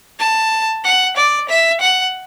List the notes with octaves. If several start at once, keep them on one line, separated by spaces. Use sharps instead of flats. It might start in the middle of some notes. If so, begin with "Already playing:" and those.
A5
F#5
D5
E5
F#5